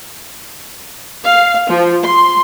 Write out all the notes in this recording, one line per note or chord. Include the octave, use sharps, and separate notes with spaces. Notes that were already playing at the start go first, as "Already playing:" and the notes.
F5
F3
C6